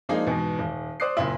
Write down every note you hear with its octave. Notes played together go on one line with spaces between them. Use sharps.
F3 G#3 A#3 D4 D#4 G#4
E2 G#2 B2
D#1
C5 D5 D6 D#6 F#6 C7
F#1 A#2 E4